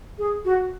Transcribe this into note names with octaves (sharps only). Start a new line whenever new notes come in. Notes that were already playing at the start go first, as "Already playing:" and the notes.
G#4
F#4